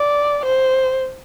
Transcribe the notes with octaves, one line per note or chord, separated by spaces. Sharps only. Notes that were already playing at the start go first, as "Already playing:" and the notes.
Already playing: D5
C5